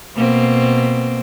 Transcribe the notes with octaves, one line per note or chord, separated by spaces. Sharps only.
B2 A#3 C4